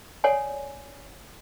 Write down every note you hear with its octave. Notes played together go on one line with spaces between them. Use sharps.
A4 C#5 D5 F#5 G#5